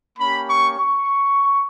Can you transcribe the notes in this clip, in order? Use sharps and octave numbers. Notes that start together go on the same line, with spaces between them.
A#3 C#4 G4 B5
C#6
C#6